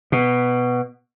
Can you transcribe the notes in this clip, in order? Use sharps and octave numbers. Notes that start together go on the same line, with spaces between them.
B2